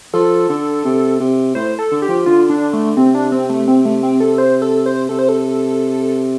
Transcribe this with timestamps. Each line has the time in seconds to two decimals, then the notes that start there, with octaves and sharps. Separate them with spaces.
0.14 F3 A4
0.49 D3
0.84 C3
1.20 C3
1.55 A2 C5
1.79 A4
1.91 D3
2.02 G4
2.08 F3
2.26 D3 F4
2.50 D4
2.73 A3
2.97 C3 C4
3.15 D4
3.32 C4
3.49 A3
3.68 C4
3.85 A3
4.03 C4
4.20 A4
4.38 C5
4.62 A4
4.86 C5
5.09 C3 A4
5.19 C5
5.29 A4